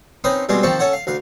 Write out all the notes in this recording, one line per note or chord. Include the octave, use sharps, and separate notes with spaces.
C4 C#4 D#4 B4 D#6
B2 G3 G#3 C4 G#4
D#3 F3 C4 A5 C#6
C#4 A4 C#5 F#5
F5
D2 F5